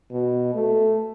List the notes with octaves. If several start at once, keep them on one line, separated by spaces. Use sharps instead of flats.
B2
A3